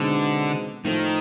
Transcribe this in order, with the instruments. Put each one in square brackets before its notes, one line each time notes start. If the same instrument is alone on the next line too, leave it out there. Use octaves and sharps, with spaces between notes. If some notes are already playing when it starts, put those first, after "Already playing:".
Already playing: [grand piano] B2 G#3 C4 D#4 [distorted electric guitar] D3
[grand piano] A2 F3 A3 [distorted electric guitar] D#3